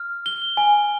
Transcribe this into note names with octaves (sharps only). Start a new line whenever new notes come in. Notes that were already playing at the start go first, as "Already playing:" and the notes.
Already playing: F6
G7
G#5